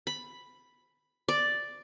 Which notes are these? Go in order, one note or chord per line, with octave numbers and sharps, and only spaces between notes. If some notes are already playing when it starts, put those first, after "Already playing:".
B5
D5